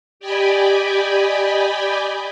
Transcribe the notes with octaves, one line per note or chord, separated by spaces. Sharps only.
G4 D5 D#5 G5 G#5 B5